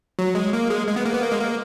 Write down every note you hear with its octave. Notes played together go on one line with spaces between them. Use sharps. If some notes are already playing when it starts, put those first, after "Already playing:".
F#3
G#3
A#3
G#3
G#3
B3
A#3
B3
A#3
G#3
A#3